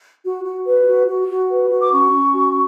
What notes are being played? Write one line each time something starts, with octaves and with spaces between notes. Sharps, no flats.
F#4
F#4
B4
F#4
F#4
F#4
B4
F#4
D6
C#4 C#6
C#4
F#4